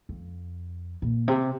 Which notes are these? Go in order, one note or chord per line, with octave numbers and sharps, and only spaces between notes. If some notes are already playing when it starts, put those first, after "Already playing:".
F2
A#2
C3